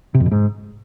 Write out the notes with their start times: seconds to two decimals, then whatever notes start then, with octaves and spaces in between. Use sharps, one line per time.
0.15 C3
0.20 F2
0.26 B2
0.32 G#2